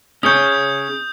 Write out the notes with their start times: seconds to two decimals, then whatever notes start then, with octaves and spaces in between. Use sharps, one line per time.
0.23 C#4 G#4 C#5 D#6 G6